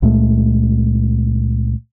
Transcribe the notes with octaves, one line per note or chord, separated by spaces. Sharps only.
C#2 A#2 G#3 A3